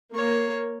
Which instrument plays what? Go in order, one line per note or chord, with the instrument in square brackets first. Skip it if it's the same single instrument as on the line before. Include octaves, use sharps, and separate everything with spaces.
[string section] A#3 [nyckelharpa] C#5